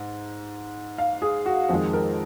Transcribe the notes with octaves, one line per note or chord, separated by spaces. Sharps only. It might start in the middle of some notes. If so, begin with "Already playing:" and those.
Already playing: G#2
F5
G#4
F#4
F2 D#3 G#3
A#4